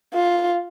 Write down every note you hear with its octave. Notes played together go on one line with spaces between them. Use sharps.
F4